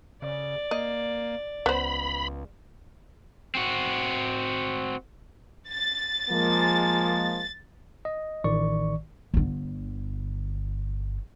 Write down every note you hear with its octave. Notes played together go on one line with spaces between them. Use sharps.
C#3 D5
A#3 D#5
C#2 B3 C5 B5
C4 F#4
A6
F3 G#3 A#3
D#5
A1 D#3 D5 C#6
G1 D3